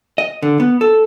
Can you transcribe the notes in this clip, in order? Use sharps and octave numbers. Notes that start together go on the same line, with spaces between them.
D#5
D3
B3
A4